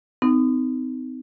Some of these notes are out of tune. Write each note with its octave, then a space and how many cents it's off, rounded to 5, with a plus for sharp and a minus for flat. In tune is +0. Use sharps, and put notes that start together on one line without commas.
C4 -40 D#4 +0